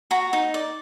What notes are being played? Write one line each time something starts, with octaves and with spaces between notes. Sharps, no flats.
F#4 A#5
D#4
D5